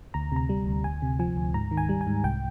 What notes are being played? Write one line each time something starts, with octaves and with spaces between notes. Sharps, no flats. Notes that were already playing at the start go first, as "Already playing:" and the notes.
D2 A#5
C3 A#5
G3
D2
D2 G#5
C3
F3 G#5
D2
G#2 A#5
D#3
G#5
G3
G#5
G#2
C2 G5